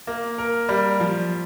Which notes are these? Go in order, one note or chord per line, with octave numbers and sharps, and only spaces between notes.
A#3
A#4
G3
F3